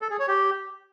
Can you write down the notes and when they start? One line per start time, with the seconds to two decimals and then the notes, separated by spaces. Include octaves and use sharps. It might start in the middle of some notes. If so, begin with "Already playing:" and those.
0.02 A4
0.10 G#4
0.19 C#5
0.28 G4